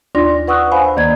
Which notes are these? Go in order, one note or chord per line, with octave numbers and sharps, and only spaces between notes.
D#2 D4 F4 D5 C6 A#6
B4 F#5 C#6 D#6 E6 F#6
C5 F5 G#5 B5
D2 D#3 A#3 D5 G#6